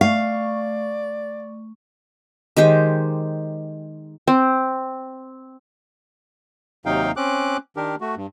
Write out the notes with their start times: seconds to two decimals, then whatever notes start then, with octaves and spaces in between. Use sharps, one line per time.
0.01 A3 D5 F5 C#6
2.57 D#3 G#3 G4 C5
4.28 C4
6.86 D#2 C3 F#3 D#4 F5 G5
7.17 C4 C#4 D6 F#6
7.77 D#3 D4 G4 A#4
8.01 A3 F#4
8.17 G2